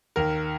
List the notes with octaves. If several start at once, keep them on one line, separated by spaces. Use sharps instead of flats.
D#2 A#4